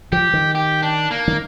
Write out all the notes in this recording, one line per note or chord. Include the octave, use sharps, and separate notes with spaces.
F3 G4
D#3
G4
D4
A#3
D#3